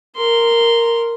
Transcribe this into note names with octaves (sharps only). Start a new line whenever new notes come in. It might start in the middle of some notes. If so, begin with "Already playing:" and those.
A#4 C6